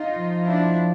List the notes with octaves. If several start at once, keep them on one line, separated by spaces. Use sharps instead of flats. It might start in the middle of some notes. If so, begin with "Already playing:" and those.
Already playing: D#4 F4
F3
D4 E4